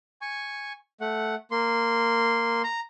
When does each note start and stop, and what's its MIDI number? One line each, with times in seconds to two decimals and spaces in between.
0.22 0.73 80
0.22 0.73 85
1.01 1.35 57
1.01 1.35 78
1.51 2.62 58
1.51 2.62 84
2.64 2.80 82